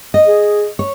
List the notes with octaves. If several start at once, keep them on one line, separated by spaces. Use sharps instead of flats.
D#5
G#4
C#5